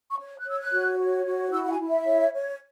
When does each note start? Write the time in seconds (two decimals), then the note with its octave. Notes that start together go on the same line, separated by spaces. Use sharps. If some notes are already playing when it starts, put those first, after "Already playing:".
0.10 C#6
0.19 C#5
0.38 F#6
0.46 C#5 E6
0.59 F#6
0.72 F#4
0.99 C#5
1.25 F#4
1.52 E4 E6
1.65 F#5
1.70 G#5
1.79 E4
1.88 E5
2.05 C#5
2.33 C#5